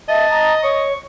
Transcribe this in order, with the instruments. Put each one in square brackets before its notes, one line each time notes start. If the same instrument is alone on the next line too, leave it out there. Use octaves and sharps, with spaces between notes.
[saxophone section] D#5 [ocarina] E5 [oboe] A5
[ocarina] A#5
[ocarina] C#5 [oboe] C#6